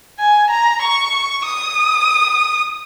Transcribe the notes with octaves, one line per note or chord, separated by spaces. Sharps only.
G#5
A#5
C#6
D#6